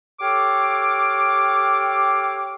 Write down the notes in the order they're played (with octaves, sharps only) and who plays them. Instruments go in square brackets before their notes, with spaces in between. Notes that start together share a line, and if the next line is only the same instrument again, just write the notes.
[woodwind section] G4 A4 C#5 F5 D6